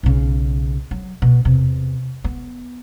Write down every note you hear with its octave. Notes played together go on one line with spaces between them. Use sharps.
B1 C#3
F#3
B2
E2 C3
B3